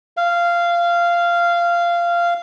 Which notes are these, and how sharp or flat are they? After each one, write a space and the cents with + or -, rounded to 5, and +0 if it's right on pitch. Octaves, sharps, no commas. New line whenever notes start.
F5 -15